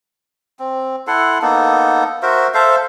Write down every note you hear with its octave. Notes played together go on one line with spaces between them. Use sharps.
C4
E4 A4 F#5 C6
A#3 B3 D#4 A4
F#4 A#4 C5 E5
A4 C5 E5 F5